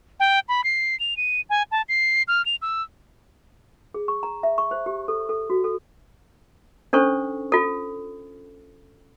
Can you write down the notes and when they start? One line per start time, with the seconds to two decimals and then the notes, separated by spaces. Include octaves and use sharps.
0.20 G5
0.49 B5
0.64 C7
1.00 F7
1.17 D#7
1.50 G#5
1.71 A5
1.89 C7
2.28 F6
2.46 F7
2.62 E6
3.94 G#4
4.08 C#6
4.23 A#5
4.43 E5
4.58 C#6
4.71 C5
4.86 G4
5.08 A4
5.29 A4
5.50 F#4
5.64 A4
6.93 C#4 D4 A4 C5 C#6
7.52 F4 A4